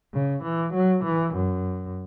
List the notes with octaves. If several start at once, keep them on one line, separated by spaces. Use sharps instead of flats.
C#3
E3
F#3
E3
F#2